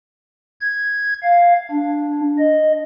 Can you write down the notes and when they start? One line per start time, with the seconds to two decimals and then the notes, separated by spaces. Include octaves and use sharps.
0.61 G#6
1.23 F5
1.71 D4
2.39 D#5